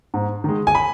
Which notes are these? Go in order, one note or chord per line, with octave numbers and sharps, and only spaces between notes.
G#2
D#3 G#3
G#5
B5